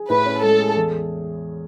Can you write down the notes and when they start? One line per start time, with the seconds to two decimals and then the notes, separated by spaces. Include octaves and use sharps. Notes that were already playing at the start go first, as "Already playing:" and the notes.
Already playing: G#4
0.09 A2 B4
0.26 C#4
0.43 G#3 A4
0.60 G#4
0.76 E2